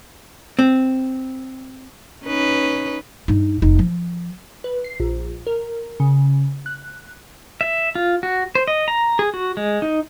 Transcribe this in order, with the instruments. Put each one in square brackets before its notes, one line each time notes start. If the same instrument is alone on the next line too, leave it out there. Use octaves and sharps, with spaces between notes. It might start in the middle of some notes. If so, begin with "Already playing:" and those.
[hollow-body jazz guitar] C4
[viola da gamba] C#4 D#4 B4
[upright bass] G2 D#4
F1 D#4
F3
[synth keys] B4
C7
A#1
A#4
C#3
F#6
[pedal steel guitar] E5
F4
F#4
C5
D#5
A#5
G#4
F#4
G#3
D#4